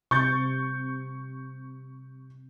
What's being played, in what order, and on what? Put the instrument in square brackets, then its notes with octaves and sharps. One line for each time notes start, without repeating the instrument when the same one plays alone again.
[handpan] C3 [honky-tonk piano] C#6 G6 A6